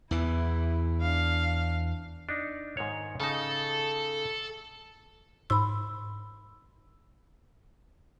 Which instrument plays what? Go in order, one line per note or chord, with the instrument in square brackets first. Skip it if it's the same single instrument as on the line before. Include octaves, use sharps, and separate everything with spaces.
[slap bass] E2 E3 [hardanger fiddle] E4
[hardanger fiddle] D4 F5
[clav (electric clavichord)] D4 D#4
G#2 D#3 C#5
[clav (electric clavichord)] C#3 D#4 [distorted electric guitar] A4
[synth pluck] G#2 C6 [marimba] B5 E6